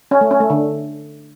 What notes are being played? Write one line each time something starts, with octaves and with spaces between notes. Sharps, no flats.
C#4
A3
C#4
A3
D3